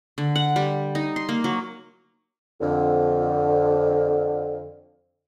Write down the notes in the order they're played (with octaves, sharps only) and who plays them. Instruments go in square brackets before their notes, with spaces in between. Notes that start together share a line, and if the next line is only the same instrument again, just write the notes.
[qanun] D3
F#5
G3
D#4
C6
A#3
F#3
[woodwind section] F2 D3